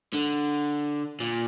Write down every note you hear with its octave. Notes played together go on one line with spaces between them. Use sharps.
D3
A#2